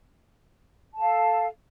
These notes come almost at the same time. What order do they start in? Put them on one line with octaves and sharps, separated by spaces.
A5 A4 F5